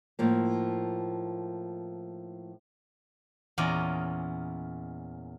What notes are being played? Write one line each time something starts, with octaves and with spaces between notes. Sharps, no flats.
A2 F3 A#3
E2 A#2 C#4 A#4 D#5